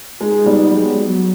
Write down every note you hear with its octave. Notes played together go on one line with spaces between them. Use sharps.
G#3 D#4
G3 B3
F#3 G#3
F#3